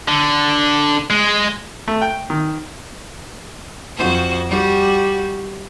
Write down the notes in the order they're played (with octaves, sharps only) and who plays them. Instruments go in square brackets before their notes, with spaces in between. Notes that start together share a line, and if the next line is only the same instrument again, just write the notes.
[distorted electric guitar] D3
G#3
[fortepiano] A3
G5
D#3
[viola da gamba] F2 F#4 C5
G3 F#4 G4